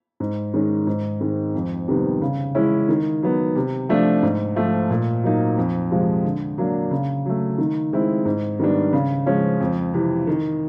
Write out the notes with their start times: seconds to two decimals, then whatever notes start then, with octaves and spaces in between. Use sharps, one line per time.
0.20 G#2
0.54 D#3 G#3 C#4
0.87 G#2
1.21 D#3 G#3 C4
1.54 F2
1.88 C3 D#3 G3 B3
2.21 C#3
2.55 E3 G#3 C#4 E4
2.89 D#3
3.23 F#3 B3
3.55 C3
3.89 F3 A3 D4
4.23 G#2
4.56 F3 A3
4.90 A#2
5.24 F#3 A#3 D#4
5.57 F2
5.91 C3 F3 G#3
6.24 D3
6.58 F#3 A#3 D4
6.91 C#3
7.26 F#3 A3
7.58 D#3
7.93 G#3 C4 E4
8.25 G#2
8.60 D#3 G3 B3 D4
8.93 C#3
9.26 F3 G#3 C#4
9.60 F2
9.94 C3 E3
10.27 D#3